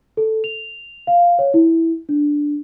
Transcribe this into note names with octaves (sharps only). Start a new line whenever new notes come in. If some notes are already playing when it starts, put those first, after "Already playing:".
A4
F7
F5
C#5
E4
D4